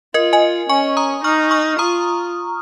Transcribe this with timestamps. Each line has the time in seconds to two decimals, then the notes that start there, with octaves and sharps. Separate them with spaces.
0.14 F4 A#4 D#5
0.33 D#5 G#5
0.69 C#4 G#5 C#6
0.97 A#5 D#6
1.24 D#4 C#6 F6
1.51 C#6 F6
1.79 F4 A#5 D#6